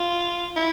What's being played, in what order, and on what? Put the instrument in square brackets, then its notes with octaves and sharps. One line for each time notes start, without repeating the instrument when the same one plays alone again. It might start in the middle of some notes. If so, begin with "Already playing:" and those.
Already playing: [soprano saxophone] F4
E4